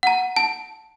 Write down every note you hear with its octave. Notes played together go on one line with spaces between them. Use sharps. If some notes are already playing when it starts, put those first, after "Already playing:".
F#5 A#5
A5